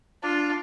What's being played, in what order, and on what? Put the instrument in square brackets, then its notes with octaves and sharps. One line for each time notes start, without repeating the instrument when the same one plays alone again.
[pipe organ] D4 [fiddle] F4